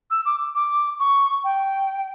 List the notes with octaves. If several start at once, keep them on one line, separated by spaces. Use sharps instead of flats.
E6
D6
D6
C#6
G5